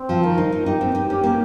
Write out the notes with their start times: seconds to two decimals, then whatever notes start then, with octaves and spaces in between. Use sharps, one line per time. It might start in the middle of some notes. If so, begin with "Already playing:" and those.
Already playing: C4
0.09 F3
0.23 D#3 A#4
0.38 D#4
0.52 D#4
0.66 D#4 G4
0.81 C4
0.95 D#4
1.09 C#4 G4
1.24 A#3